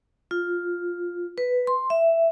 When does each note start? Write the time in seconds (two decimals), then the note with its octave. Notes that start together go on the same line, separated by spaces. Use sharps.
0.31 F4
1.38 B4
1.67 C6
1.90 E5